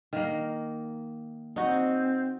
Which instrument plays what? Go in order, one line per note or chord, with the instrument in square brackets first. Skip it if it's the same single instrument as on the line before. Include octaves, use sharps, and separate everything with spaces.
[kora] D#3 A#3
[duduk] C4 [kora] D#4 F#4